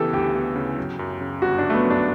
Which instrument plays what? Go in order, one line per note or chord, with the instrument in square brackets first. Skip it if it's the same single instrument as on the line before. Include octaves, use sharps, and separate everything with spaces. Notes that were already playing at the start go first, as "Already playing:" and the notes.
Already playing: [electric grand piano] C#3 E3 B3 [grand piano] G4 A4
[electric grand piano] D2 [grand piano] G4
[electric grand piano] B3
C#3
F#3
F#2
C#3
[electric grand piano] G1 [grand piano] F#4
[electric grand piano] F#3 [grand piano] D4
[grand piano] A3
B3
[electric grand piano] F#2
[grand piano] D4